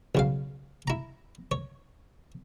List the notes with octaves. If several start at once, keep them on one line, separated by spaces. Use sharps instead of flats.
B1 C#3 F5
E4 A#5
C#5